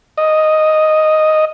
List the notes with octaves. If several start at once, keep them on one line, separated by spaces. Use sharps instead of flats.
D#5